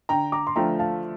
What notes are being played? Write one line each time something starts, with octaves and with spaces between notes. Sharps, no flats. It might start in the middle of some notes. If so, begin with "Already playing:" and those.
D3 G5 A#5
A#5 D6
C6
F3 A3 D4 F4 G5 A#5
F5 A5